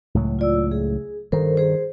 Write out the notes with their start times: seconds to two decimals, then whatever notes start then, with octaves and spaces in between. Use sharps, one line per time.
0.15 C#2 A2 F#3
0.39 F4 D5 E6
0.71 G#4
1.32 G2 D#3 A4 A#4 C5
1.57 G#4 C5